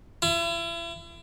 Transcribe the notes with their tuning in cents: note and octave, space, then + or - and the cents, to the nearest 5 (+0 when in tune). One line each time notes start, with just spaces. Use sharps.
E4 +40